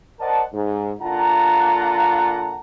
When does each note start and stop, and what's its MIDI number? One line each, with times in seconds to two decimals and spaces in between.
0.19 0.41 70
0.19 0.41 72
0.19 0.41 74
0.19 0.41 75
0.19 0.41 78
0.19 0.41 81
0.53 0.91 44
1.01 2.59 50
1.01 2.59 58
1.01 2.59 65
1.01 2.59 78
1.01 2.59 81
1.01 2.59 82